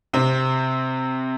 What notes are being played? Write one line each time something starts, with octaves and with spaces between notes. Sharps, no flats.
C3 C4